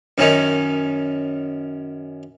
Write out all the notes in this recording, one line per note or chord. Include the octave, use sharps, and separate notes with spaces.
F#2 D#3 C#4 D#4